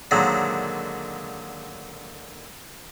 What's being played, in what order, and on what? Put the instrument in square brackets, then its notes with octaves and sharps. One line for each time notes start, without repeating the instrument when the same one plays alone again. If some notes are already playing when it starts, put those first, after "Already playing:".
[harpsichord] A#2 D3 D#3 F#3 G#3 C4